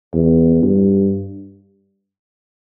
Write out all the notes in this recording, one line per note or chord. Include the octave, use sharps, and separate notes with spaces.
E2
G2